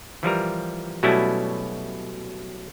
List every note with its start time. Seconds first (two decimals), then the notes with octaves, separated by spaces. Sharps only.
0.23 E3 F3 G3 A#4
1.03 B2 F#3 G3 A3 C#4 E4